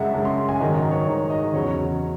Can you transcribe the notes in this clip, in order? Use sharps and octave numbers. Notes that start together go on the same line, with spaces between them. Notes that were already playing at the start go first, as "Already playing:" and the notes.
Already playing: F#2 C#3 G#3 E5 F#5
F#2 C#3 G#3 A5
C6
G#5
G#2 D#3 F#3 D#5
D#5
C#5
G#2 D#3 F#3 C#5
D#5
E2 C#3 F#3 C#5
C#3